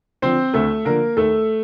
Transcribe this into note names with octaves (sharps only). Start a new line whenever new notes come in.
D3 F3 C4 C5
D2 A3 A4
D3 F3 A#3 A#4
D#2 A3 A4